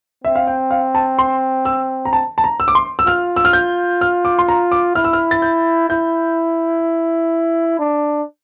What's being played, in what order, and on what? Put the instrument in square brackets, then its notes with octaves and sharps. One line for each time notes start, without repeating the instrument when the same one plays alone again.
[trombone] C4 [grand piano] E5
[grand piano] F5
G5
F5
A5
C6
E6
A#5
A5
A5
A#5
E6
D6
C6
E6
[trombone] F4 [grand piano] F6
[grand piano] E6
F6
G6
F6
D6
C6
A#5
D6
[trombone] E4 [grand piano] F6
[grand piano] E6
F6
A6
G6
[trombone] E4 [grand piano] G6
[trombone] D4